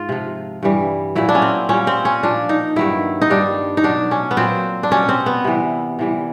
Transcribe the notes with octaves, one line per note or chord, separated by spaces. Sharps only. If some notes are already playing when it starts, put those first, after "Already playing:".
Already playing: G#2 F4
C3 F3
G2 E3 G3
A#2 F#3 E4
D4
C#4
C4
A#2 G3 C#4
C4
C#4
A#2 F3 D4
D#4
G2 D#3 F#3 E4
D#4
G2 D#3 G3 D4
D#4
B2 F#3 D4
C#4
B3
A#2 F#3 C4
D4
B2 G3 C#4
C4
B3
C3 E3 G3
C3 E3 G3